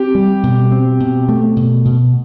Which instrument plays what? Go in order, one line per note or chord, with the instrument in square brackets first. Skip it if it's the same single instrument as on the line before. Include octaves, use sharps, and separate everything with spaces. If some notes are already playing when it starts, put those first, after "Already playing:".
Already playing: [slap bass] C4 [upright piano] G4
[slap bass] G3
B2
C4
B2
A3
B2
B2